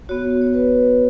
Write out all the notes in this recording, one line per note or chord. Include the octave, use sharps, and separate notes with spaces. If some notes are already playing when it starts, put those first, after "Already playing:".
B3 F#4 C#5
C#5
B4